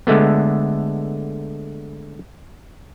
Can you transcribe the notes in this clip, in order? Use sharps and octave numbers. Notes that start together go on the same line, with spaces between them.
D3 G#3 A3 B3